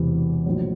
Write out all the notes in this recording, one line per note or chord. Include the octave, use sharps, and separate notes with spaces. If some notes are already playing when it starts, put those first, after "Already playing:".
Already playing: E1 E2 C3 E3
A#1 A2 F#3